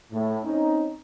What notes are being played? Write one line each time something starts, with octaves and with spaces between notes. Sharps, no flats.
A2
C4 C#4 D#4